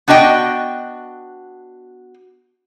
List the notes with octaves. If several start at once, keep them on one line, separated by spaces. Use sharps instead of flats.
B3 D4 F#4 D#5 G5